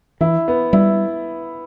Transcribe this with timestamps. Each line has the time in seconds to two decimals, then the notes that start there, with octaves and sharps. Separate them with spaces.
0.21 E3 E4
0.48 B3
0.73 G3 E4